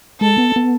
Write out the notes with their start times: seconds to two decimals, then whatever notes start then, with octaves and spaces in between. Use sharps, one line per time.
0.21 G#3 A4
0.38 B3
0.56 B3